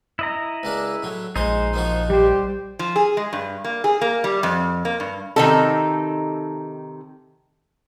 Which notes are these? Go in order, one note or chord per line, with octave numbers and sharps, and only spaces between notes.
E4 D#5 A#5
C#2 A#3 D4
A2 F#3
A#1 G#3 D#4 C5 D#5
D#3 F3 F#4
G3 G4 C5
F3
G#4
G#3
G2
A#3
G#4
A#3
G3
F2
A#3
G2
C3 D#3 D#4 A4